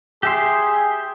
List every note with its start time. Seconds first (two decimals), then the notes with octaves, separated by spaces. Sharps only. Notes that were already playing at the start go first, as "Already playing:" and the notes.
0.23 G4 G#4 E5 C6